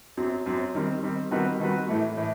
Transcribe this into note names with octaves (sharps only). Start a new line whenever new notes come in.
F#2 F#3 C4
F#2 F#3 C4
D#3 G3 C4
D#3 G3 C4
D#3 G3 C4 F#4 B4
D#3 G3 C4 F#4 B4
A2 E3 A3
A2 E3